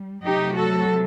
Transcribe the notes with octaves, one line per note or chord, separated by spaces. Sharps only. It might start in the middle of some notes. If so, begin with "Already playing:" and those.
Already playing: G3
C3 F#3 A3 D#4 G4
F#4 A4